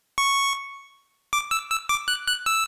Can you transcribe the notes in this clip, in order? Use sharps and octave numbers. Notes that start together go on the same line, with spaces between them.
C#6
D6
E6
E6
D6
F#6
F#6
E6